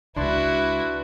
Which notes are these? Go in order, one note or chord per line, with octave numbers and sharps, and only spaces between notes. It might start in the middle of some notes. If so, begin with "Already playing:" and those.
C#2 D4 E4 F#4 B4 C6 A6